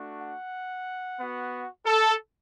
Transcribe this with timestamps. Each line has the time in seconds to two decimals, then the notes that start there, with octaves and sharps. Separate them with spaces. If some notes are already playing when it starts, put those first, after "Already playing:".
Already playing: A3 D4 F#4
0.22 F#5
1.20 B3 F#4
1.86 A4